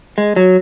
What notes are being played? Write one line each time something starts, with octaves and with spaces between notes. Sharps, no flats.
G#3
F#3